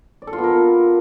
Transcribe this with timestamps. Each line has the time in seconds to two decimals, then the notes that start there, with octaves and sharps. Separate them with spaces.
0.22 D5
0.27 A4
0.33 F4
0.38 B3
0.44 A#4